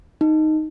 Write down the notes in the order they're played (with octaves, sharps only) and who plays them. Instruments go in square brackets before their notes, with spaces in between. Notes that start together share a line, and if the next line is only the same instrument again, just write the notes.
[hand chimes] D#4